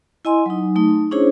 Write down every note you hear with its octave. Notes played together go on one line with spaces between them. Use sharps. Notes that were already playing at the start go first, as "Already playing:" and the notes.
E4 D#5 G#5 C6
F#3 D#4
A3 D#4
C#4 D4 E4 G#4 C5 C#5